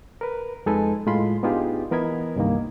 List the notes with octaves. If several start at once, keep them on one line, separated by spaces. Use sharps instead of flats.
A#4 B4
F2 G#3 D#4 A4 B4 G#5
A2 G#3 F4 B5 C6
B3 D4 D#4 F4 G4 G#4
E3 B3 A#4 D#5 B5 G#6
C2 G2 D#3 A#3